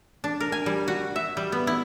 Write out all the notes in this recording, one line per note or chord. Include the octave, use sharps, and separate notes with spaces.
D4
A#4
G#5
G3
F#4
E5
G3
B3
E4